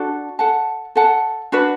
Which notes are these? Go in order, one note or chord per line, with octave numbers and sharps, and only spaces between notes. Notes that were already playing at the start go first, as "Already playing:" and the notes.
Already playing: D4 F#4 A4
A4 F#5 A5
A4 F#5 A5
D4 F#4 B4